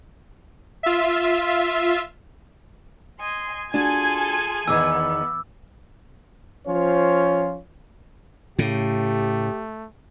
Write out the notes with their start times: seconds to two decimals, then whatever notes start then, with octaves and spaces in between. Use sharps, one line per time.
0.83 F4 E5
3.20 D#5 G#5 C6
3.74 D4 F4 F#4 G#4 A4 G#5
4.68 E2 D#3 E3 B3 D6 E6
6.67 F3 C#4 F4 C5 C#5
8.59 A2 C#3 A3 G4